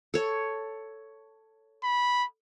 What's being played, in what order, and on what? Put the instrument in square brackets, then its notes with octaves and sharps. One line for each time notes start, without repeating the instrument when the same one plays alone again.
[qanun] A4 C#5
[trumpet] B5